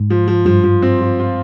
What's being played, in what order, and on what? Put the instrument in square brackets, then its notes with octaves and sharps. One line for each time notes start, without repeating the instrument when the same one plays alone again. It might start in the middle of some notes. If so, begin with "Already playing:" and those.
Already playing: [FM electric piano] G#2
[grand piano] F3
F3
[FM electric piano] G2 [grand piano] F3
[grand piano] F3
C4
F3
F4